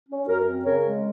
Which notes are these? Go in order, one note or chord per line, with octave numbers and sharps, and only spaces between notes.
C#4
F#2 F#4 A#4
C4
C#3 A#4 C#5
G#3